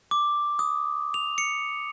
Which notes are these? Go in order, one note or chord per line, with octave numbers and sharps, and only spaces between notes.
D6
D#6
F7
C#7